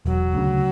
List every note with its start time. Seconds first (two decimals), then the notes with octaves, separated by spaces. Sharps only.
0.06 E1 F#3
0.34 D2 C#3